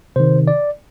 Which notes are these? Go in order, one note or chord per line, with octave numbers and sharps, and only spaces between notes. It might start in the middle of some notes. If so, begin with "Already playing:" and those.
C3 D#3 C5
D5